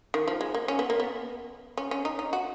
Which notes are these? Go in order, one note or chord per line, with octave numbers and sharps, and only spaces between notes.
D#3
F3
G#3
A#3
C#4
B3
A#3
B3
C#4
C#4
D#4
D#4
F#4